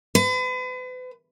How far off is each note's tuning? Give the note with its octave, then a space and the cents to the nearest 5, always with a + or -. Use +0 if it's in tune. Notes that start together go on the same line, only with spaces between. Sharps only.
B4 +40